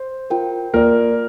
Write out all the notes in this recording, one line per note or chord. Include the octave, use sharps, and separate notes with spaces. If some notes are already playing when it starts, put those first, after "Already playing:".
Already playing: C5
F4 A#4 G5
A#3 F4 A#4 D5